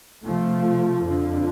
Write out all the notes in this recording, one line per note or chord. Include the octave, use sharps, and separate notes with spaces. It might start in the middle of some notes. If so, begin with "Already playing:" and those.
C3 F3 A3
F2 D3 F3